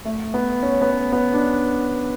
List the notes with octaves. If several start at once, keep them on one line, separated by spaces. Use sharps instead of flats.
A3
B3
C#4
B3
C#4
B3
D4